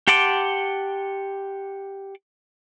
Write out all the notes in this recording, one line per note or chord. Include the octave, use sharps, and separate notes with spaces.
G4 F#5 A5 C6 D6